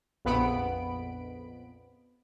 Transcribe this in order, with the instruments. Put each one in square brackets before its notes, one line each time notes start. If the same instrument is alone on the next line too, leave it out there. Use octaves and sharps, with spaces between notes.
[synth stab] A#1 F2 B3 B5 D7